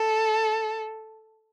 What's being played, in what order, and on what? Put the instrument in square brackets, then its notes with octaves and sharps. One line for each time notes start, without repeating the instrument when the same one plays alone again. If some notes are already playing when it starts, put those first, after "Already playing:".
Already playing: [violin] A4